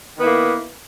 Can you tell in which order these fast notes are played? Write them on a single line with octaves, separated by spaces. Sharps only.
D#3 B3 E4 A#3